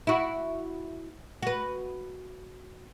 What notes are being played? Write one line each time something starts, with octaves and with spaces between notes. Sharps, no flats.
E4 F#4
F#4 B4